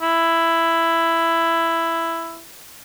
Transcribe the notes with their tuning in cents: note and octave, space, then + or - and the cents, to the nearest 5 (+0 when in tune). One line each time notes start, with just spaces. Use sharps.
E4 +10